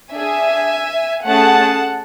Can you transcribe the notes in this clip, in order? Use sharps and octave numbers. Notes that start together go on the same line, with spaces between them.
D4 G#4 E5 G#5
A3 C#4 G#4 F#5 A5